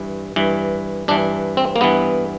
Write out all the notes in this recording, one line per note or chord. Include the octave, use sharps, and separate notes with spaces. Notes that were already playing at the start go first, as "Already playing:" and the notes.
Already playing: G2 E3
G2 E3
G2 E3 D4
C4
A#3
G2 E3 B3